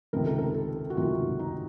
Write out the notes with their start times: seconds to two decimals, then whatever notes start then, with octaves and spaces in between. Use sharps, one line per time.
0.13 C#2 C3 D#3 A#4
0.25 A4
0.39 A#4
0.54 A4
0.90 F#4
0.97 C#2 C3 D#3 F4
1.39 D#4